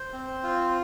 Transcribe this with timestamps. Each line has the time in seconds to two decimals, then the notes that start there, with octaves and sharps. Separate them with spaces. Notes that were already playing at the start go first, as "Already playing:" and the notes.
Already playing: C5
0.13 C4
0.43 F4